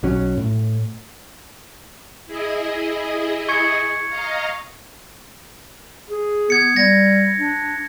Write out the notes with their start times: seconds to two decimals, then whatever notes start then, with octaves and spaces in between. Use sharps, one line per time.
0.03 B1 F#3 C#4
0.37 A2
2.26 E4 G#4 D#5
3.49 C#6 G#6 C#7
4.09 D#5 F5 A#5
6.10 G#4
6.50 B3 G#6 C#7
6.76 G3 G#6 A#6
7.39 D4